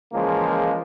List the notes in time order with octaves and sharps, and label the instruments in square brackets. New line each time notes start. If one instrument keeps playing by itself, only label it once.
[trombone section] C#3 E3 F3 G#3 A#3